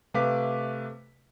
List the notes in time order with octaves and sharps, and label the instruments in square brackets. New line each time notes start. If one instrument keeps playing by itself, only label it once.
[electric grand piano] C3 A3 B4 F5 D6 B6